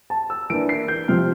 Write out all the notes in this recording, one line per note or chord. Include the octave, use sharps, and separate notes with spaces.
A5
E6
E3 A#3 D4 D7
C7
G6
C3 F3 C4 F6